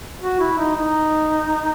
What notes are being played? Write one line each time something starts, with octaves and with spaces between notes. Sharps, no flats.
F#4
E4
D#4
D#4